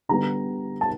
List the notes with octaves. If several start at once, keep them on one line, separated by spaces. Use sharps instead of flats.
D3 G3 B3 A#5
A5